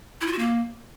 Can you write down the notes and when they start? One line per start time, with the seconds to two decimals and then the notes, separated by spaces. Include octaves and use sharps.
0.21 E4
0.27 F4
0.33 F#4
0.39 A#3